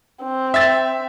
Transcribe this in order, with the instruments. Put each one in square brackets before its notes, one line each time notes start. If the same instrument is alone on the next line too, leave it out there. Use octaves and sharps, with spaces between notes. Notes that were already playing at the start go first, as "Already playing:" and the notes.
[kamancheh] C4
[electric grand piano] E5 E6 A6